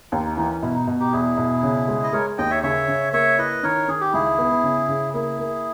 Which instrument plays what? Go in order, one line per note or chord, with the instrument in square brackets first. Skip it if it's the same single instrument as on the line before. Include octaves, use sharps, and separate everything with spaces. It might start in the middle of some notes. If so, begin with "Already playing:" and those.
[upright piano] D#2 [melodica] D#4
[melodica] D#4
[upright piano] E3 [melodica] D#4
[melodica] C#4
[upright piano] B2 [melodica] E4
[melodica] D#4
[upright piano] B2
[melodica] D#4 G4
[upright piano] E2 [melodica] E4 G#4
[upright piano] B2
C#3
G#3
[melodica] D#5
[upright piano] G#3 [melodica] A#4 C#5
[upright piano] D#2 [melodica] D#5 G5
[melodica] C#5 E5
[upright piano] C#3 [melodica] C#5 E5
[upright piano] C#3
[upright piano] A#3 [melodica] C#5 E5
[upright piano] E4 [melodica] B4 D#5
[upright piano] D#3 [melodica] A#4 C#5
[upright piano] D#3 [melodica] G#4
[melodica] G4
[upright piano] C#2 [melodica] E4 G#4
[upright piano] B3
C#3
C#3
[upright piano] A#3 [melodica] E4 G#4
[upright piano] A#3